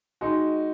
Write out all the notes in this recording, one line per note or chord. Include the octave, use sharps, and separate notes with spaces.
G#3 D#4 F#4